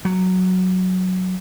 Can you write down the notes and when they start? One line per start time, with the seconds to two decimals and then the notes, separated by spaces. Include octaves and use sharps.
0.05 F#3